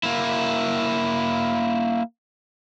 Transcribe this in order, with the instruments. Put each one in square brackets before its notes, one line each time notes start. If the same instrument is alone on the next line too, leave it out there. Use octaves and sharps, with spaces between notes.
[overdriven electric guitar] A#3 E4